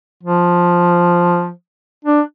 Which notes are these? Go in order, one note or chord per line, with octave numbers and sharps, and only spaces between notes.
F3
D4